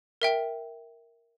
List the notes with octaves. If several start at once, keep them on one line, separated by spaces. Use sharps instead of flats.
A#4 E5 G5